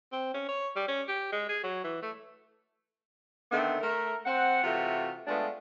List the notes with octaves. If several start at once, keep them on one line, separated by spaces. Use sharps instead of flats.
C4
C#4
C#5
G3
C#4
G4
G#3
G#4
F#3
E3
A3
D3 D#3 A3 B3 C4
A3 A#4
C4 F#5
C3 E3 A3 F4 F#4
G#3 A3 B3 D4 F4